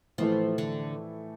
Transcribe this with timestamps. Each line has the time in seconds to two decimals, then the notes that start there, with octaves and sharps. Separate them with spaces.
0.18 A2 E3 F3 A3
0.58 D3